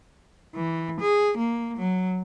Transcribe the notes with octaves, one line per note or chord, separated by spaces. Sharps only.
E3
G#4
A#3
F#3